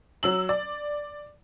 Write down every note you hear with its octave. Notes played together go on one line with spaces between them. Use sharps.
F#3 E6 F#7
D5